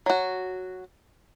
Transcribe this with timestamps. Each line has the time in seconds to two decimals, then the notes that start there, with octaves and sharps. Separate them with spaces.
0.06 F#3 F#4